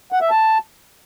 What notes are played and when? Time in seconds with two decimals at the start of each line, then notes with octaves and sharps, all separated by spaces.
0.12 F#5
0.21 E5
0.30 A5